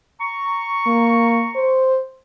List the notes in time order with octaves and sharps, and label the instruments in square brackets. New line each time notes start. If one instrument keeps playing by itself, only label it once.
[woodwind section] A#5 C#6
[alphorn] A#3
C5